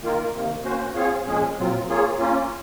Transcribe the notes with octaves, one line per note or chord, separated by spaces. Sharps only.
D#3 A#3 F4 A#4
C3 D#3 A#3
A#3 C#4 F#4 C5
C4 F4 G#4 C#5 F5
A#2 F3 G#3 C#4 G#4
A#2 F#3 C4 F4
A#3 F4 G#4 C#5
A#3 C#4 F4